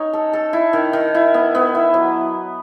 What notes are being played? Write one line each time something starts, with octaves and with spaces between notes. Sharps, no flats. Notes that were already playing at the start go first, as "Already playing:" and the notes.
Already playing: C#4 D#4 C#5
A4
A4
E4
D#3
D#3
E4
B3
B3
E4
F#3